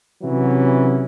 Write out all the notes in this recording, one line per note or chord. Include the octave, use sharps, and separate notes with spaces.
C3 E3 F#3 C#4